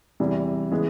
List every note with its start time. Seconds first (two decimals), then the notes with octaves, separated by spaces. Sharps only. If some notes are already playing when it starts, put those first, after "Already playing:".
0.20 E2 C3 E3 G3
0.71 C#3 E3 G#3 B3